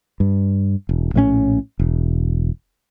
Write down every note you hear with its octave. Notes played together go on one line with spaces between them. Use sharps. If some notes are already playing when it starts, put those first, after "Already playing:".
G2
E1
A#1 A2 D3 C#4
E1